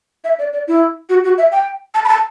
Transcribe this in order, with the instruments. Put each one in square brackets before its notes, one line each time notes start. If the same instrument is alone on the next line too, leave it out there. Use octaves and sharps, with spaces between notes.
[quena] E5
D5
D5
E4
F#4
F#4
E5
G5
A5
B5
A5